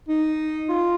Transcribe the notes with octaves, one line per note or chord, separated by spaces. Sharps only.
D#4
F4